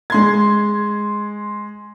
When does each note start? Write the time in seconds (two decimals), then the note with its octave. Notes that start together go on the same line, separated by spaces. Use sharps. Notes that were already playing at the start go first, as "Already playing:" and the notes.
0.10 G#3 C6 G#6